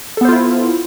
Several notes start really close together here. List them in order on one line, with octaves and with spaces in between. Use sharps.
A4 B3 C5 F4 E4